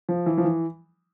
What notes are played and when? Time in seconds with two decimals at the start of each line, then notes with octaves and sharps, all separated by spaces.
0.09 F3
0.26 E3
0.38 F3
0.45 E3